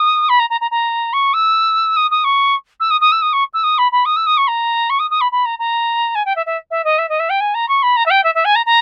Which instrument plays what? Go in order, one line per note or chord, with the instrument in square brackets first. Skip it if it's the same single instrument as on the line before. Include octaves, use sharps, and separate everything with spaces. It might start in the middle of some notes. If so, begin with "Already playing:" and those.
Already playing: [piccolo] D#6
B5
A#5
A#5
A#5
A#5
C#6
E6
D#6
D#6
C#6
E6
D#6
D#6
E6
D#6
C#6
E6
D#6
B5
B5
D#6
E6
D#6
C#6
A#5
C#6
D#6
D#6
B5
B5
A#5
A#5
G#5
G5
E5
E5
E5
D#5
E5
D#5
E5
G5
G#5
A#5
C#6
B5
A#5
E5
G5
E5
E5
G#5
A#5
A#5